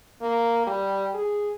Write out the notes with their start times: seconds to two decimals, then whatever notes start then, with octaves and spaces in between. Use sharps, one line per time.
0.21 A#3
0.67 G3
1.14 G#4